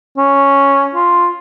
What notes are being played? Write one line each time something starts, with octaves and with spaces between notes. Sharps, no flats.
C#4
F4